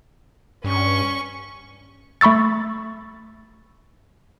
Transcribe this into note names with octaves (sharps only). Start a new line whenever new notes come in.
G2 C#4 C#6
A3 B5 C#6 E6 A6